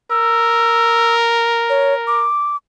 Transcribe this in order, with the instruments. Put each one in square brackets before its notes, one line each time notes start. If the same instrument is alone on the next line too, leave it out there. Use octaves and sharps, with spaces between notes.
[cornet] A#4 [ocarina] E6
[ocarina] C#5
D6